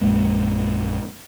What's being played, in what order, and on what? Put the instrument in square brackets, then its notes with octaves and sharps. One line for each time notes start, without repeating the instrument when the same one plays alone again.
[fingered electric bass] A#1 F#2 G#3 A#3